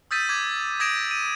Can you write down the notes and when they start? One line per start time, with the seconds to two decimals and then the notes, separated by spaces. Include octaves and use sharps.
0.11 D#6 E6 G6 A6 B6 D#7
0.29 D6 G#6
0.80 D#6 G#6 A#6 D7 E7
1.11 D#7